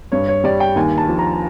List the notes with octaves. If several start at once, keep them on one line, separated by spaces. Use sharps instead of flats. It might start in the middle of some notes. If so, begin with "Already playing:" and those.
G2 C#5
C#5
G3 D5
G5
D#2 G#5
A5
F3
A#5